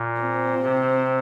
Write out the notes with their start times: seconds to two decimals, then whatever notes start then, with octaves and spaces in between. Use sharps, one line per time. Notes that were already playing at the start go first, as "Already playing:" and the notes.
Already playing: A#2
0.21 C4
0.62 C3